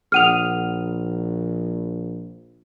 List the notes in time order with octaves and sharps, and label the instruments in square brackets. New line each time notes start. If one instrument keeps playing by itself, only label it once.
[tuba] A#1 [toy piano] G#4 F#5 D#6 [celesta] F6 D#7 F7